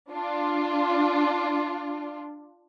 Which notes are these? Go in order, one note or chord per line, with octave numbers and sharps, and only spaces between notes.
D4 F4